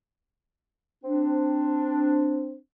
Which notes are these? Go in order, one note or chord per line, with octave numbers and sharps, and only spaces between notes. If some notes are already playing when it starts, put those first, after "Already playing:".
C4 D4